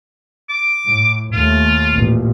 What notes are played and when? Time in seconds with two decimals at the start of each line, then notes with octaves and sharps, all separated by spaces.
0.49 D6
0.86 A2
1.33 D#2 A3 F4
1.94 A1 A#2